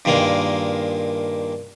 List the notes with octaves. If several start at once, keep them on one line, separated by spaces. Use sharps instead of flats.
G2 A#2 D#3 G#3 A#3 A#5